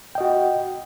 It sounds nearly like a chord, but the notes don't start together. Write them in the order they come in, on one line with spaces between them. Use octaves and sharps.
G5 D#5 F#4